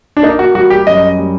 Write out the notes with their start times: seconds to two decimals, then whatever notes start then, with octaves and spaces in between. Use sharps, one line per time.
0.17 D4
0.23 A#3 D#4
0.39 F#4
0.55 G3 F#4
0.70 G4
0.87 F#2 D#5
1.18 G3